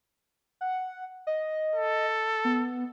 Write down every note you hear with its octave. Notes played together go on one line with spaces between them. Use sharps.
F#5
D#5
A4
B3